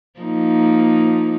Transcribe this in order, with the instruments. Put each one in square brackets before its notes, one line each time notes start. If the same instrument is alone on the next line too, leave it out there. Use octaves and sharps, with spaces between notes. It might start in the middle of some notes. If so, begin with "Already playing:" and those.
[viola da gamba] F3 A#3 D#4